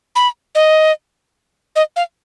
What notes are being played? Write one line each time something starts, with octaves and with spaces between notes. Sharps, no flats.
B5
D#5
D#5
F5